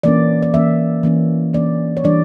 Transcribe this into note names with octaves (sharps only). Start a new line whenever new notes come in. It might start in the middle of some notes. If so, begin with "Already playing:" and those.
E3 A#3 C#4 D5
D5
E3 A#3 C#4 E5
E3 A#3 C#4
E3 A#3 C#4 D5
C#5
E3 G3 D4 D5